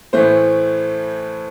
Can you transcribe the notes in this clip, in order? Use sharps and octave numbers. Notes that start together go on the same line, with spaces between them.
A2 E3 A3 C5